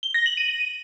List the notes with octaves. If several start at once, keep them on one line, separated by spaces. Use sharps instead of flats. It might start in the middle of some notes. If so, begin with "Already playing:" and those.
G7
A#6
F#7
D#7